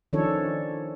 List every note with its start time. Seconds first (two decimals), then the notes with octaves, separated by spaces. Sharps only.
0.13 D#3 F3 C#4 D4 A4 C#5